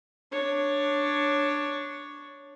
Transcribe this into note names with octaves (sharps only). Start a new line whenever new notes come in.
D4 C#5